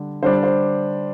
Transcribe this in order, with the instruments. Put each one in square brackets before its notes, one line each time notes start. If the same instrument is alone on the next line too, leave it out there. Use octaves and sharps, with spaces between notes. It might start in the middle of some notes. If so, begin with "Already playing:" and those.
Already playing: [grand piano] D3 G3 D4
[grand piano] D3 G3 D4 [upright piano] C5
[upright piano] D5
C5